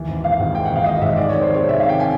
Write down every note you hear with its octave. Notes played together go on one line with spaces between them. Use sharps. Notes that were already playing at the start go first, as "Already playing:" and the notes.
Already playing: D#2 E3
G#1
G#1 F5
G#2 F#5
E3 G5
G#1 F#5
F5
G#1 D#5
G#2 E5
D#3 D5
F2 C#5
C5
G#3
C#5
C3
E5
D#3 F5
G5
G#5